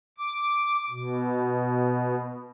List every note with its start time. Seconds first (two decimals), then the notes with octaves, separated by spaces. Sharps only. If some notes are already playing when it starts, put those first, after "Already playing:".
0.18 D6
0.90 B2